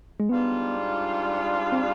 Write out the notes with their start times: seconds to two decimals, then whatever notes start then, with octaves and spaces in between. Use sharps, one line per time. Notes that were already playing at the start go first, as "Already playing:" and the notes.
0.20 G#3
0.29 G#2 G3 B3 D4 F4
1.72 C4